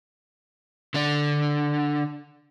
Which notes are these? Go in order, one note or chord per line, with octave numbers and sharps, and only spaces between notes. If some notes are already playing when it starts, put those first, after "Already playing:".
D3 D4